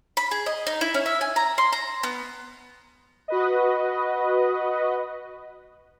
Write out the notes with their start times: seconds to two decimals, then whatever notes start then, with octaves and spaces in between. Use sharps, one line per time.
0.17 B5
0.31 G#4
0.46 D#5
0.67 D#4
0.81 E4
0.94 C#4
1.06 E5
1.21 G#5
1.36 A#5
1.58 C6
1.73 A#5
2.03 B3
3.28 F#4 B4 D#5